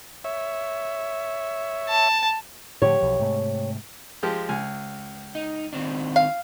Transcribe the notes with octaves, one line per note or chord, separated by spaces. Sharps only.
C#5 E5
A5
A2 D3 F3 G4 C#5
B1 F3
G#2 C3 A3
F3 G#3 G4
C#2 G#5
D#4
D#3 C4 D4
F5